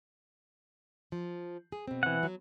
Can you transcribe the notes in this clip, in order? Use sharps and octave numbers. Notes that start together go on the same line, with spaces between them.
F3
G#4
B2 C4
E3 F#5
F#3